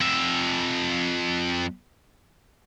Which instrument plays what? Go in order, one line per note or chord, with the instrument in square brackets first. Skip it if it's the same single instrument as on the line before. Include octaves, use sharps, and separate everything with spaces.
[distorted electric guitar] F2 E5